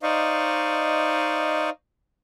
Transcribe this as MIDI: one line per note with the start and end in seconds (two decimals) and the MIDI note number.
0.03 1.70 63
0.03 1.70 72
0.03 1.70 74
0.03 1.70 75
0.03 1.70 77
0.03 1.70 85